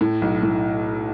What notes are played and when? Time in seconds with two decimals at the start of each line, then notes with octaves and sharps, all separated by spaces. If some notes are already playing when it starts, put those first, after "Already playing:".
0.01 A2
0.22 B1
0.43 A2